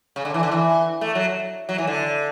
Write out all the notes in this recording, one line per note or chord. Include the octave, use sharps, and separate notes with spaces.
C#3
D3
E3
D3
E3
A3
F#3
F#3
E3
D3